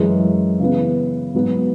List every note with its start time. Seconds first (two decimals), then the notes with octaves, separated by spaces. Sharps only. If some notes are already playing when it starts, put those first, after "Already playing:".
Already playing: F#2 E3 G#3
0.60 C#3 E3 B3
1.34 G#2 F#3 B3